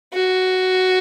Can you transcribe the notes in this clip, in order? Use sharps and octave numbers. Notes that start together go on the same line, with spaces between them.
F#4